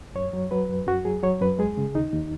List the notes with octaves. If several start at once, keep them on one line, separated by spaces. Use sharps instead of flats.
F#2 C#5
F#3
F#3 B4
F#2
F#2 F#4
F#3 G#4
F#3 C#5
F#2 B4
G#3 G#4
C#3
D#2 D#4
D#2